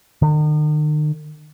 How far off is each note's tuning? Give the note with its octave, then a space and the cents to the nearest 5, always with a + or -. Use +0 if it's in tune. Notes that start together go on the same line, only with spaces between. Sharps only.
D#3 -45